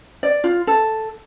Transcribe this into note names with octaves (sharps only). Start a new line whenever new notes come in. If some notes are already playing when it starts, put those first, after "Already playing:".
D5
F4
A4